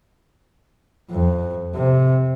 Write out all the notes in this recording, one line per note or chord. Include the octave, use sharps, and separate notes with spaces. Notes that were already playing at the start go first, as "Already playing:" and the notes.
F2
C3